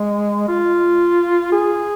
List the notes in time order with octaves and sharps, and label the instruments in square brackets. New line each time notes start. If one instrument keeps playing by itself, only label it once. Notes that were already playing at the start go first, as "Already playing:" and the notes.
Already playing: [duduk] G#3
F4
G#4